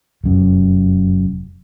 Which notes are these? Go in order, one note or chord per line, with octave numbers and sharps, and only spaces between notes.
F1 F#2